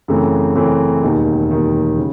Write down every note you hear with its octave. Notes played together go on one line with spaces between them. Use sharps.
F#2 C#3 E3 A3 C4
F#2 C#3 E3 A3 C4
E1 D#2 D#3
E1 D#2 D#3
C#3